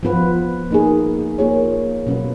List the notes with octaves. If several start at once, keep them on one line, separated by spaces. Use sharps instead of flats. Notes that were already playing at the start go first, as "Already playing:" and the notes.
F3 B3 F4 B4
A#3 D#4 G#4
A#3 F4 G#4 C#5
B2 F#3 C#4 F4 B4